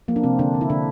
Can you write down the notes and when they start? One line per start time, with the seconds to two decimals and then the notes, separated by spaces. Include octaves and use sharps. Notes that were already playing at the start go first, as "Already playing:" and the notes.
0.08 F3 A#3
0.16 D4
0.23 C3 C4
0.39 D3 D4
0.54 D3
0.61 E4
0.70 D3 D4